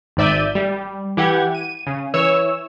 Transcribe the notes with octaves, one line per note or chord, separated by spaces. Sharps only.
G#1 G#2 D5 E5 G6 D#7
G3
E3 G4 F#5 G#6
D#7
C#3
E3 C#5 E6